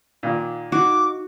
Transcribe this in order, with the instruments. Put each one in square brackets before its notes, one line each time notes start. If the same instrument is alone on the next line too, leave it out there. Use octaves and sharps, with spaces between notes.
[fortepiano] A#2 D#3 A#3
[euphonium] D#4 [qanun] F#4 [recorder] D6